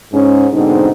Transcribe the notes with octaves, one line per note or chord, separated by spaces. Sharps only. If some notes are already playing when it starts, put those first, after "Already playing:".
G#2 C#4
G#2 B2 D3 C4 D#4